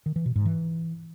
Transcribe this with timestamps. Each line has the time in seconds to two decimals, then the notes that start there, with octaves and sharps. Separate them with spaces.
0.06 D#3
0.16 E3
0.26 B2
0.36 G#2
0.45 E3